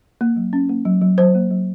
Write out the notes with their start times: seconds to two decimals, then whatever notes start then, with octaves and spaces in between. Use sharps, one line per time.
0.21 A#3
0.36 F#3
0.53 C#4
0.69 A#3
0.85 F#3
1.01 F#3
1.18 F#3 C5
1.35 A#3
1.51 F#3